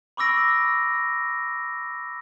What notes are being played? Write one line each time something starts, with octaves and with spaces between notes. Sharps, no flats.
B5 C#6 D6 E6 A#6 D7